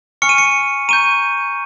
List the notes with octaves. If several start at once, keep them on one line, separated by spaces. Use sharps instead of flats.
G#5 C#6 F6 C#7
D#7
C#7
A#5 C#6 G6 D#7